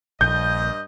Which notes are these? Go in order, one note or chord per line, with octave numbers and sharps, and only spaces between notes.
A#1 G2 D#5 G6